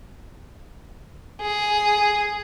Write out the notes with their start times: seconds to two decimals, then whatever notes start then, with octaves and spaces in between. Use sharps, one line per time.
1.41 G#4